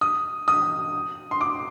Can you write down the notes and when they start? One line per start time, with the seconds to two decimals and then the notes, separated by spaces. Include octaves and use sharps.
0.01 D#6
0.48 D#6
1.31 C6
1.41 D6